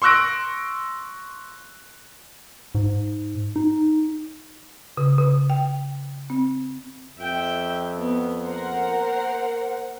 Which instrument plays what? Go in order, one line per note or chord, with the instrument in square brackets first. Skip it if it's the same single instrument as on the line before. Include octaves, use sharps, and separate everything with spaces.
[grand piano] C6 C#6 E6 F#6 A#6 D7
[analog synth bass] G#2
D#4
[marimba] C#3
C#3
G5
C4
[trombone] F2 [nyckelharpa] E5 G5
[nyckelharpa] B3
[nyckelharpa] A#3 [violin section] A#4 C5 F#5